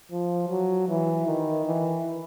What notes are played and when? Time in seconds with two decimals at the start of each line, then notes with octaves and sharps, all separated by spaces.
0.12 F3
0.49 F#3
0.89 E3
1.27 D#3
1.66 E3